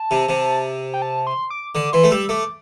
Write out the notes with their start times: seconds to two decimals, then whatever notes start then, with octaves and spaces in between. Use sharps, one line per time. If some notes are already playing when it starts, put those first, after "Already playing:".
Already playing: A5
0.11 C3
0.29 C3
0.94 G5
1.02 A5
1.27 C6
1.50 D6
1.75 D3 D6
1.93 E3 C6
2.04 A3
2.11 G3 E6
2.29 A3 D6